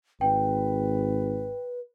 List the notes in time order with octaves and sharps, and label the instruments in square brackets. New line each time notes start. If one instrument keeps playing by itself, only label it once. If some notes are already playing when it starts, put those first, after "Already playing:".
[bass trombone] G#1 [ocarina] B4 [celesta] G5